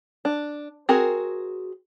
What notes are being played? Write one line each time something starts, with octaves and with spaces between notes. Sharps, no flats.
D4
C4 F#4 G#4 A#4